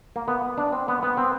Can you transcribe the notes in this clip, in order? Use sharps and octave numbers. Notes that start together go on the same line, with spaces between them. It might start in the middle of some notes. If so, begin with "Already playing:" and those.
A#3
B3
D4
C4
B3
B3
C4